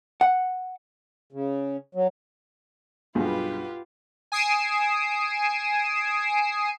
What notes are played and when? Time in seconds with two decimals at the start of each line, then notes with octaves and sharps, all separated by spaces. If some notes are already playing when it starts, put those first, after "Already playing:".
0.21 F#5
1.33 C#3
1.95 F#3
3.15 B1 G2 F4 G4 G#4 B4
4.32 G#5 D#6 C7 D7 E7